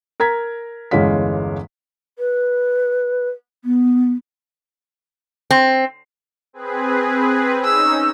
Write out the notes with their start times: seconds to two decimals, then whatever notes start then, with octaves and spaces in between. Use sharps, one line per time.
0.20 A#4 A#5 G#6 B6
0.91 G1 E2 G#3 C#4 F5 B6
2.19 B4
3.64 B3
5.51 C4
6.53 C4 G#4 B4
7.65 C#4 D#4 E6